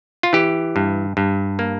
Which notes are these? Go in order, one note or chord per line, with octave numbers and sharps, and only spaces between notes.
F4
E3 G4
G2
G2
A#3